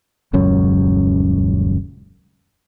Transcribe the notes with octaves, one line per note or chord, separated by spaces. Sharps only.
D#1 C#2 F#2 C#4